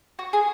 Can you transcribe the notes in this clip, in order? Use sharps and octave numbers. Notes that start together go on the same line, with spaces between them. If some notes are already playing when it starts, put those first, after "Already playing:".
F#4
G#4